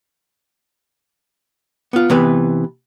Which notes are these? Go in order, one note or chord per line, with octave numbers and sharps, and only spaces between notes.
B3 F4
C3 E3 B3 B4